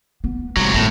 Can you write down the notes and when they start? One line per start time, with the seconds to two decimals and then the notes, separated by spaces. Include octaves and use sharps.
0.24 B3
0.57 C3 F#3 G#3
0.74 A2 D#3 B3